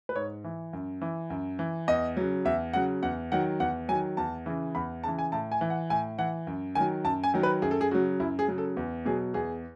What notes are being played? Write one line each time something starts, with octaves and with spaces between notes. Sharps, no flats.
B4
G#2 C#5
E3
F#2
E3
F#2
E3
E2 D#5
C#3 F#3
E2 E5
C#3 F#3 F#5
E2 F#5
D#3 F#3 F#5
E2 F#5
D#3 F#3 G#5
E2 A5
C#3 E3
E2 B5
C#3 E3 A5
G#5
A2 A5
G#5
E3
F#5
A2 G#5
E3 F#5
F#2
D#3 F#3 G#5
F#2 A5
G#5
D#3 F#3
B4
F#2 G#4
A4
G#4
C#3 F#3 F#4
F#2 E4
G#4
C#3 F#3
A4
E2
B2 F#3 G#4
E2 G#4